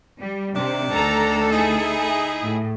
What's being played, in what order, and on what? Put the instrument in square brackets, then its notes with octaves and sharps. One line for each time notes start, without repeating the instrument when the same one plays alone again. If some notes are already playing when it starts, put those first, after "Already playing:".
[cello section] G3
[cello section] C3 [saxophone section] D#3 D4
[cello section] D2 A4 [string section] A#5
[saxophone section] D#4 [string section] E4 G#4
[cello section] A2